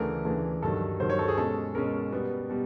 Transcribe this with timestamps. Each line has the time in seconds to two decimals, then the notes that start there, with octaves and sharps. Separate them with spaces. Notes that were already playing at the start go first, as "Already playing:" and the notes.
Already playing: D2 C#3 E3 A3 D4 A#4
0.25 D2 C#3 E3 A3 D4
0.62 G2 D#3 F#3 A4
1.00 G2 D#3 F#3 C5
1.10 C#5
1.19 A4
1.28 G#4
1.38 B2 G#3 C#4 A4
1.75 B2 G#3 C#4 A#4
2.12 B2 G3 B3
2.50 B2 G3